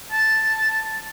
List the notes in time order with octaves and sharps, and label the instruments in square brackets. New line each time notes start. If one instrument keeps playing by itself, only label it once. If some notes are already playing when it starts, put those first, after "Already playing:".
[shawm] A5